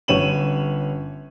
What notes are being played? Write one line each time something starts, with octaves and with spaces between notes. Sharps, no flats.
G1 C#4 C#5 D#7 E7 F#7